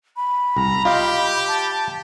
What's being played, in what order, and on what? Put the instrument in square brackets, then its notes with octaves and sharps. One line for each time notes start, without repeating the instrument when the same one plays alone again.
[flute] B5
[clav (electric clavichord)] C2 [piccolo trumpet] A#5
[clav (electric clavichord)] F4 D#5 F5 [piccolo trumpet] G4
[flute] A5